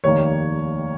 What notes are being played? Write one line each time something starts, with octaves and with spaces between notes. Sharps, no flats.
F1 D#2 D#3 A#3 C#5